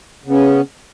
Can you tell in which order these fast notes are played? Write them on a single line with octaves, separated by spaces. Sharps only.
C#3 B3 C#4